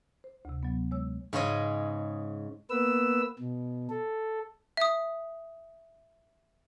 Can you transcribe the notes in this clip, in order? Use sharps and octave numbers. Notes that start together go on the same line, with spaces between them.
C5
D2 C3
F#3 B3
G#3 C#5 E6
G#2 C#3 C#4 G#4 D#5
A#3 B3 B4 E6
B2
A4
E5 D#6